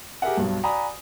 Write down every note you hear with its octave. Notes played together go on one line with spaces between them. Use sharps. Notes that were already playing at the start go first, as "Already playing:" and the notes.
G4 G#4 A#4 E5 F#5
B1 G2
D5 F#5 G#5 A#5 B5 D#6